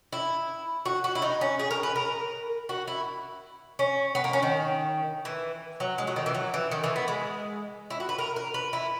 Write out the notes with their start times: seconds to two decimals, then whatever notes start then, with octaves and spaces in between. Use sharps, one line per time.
0.12 E4
0.85 F#4
1.04 F#4
1.15 E4
1.22 D#4
1.41 C#4
1.59 G#4
1.71 A#4
1.83 B4
1.96 A#4
2.69 F#4
2.87 E4
3.79 C#4
4.15 B3
4.24 A#3
4.33 C#4
4.43 D#3
5.25 E3
5.80 F#3
5.98 G#3
6.07 F#3
6.16 D#3
6.26 E3
6.35 F#3
6.54 E3
6.71 D#3
6.84 E3
6.96 B3
7.08 G#3
7.90 E4
8.00 F#4
8.09 B4
8.18 A#4
8.36 A#4
8.54 B4
8.73 E4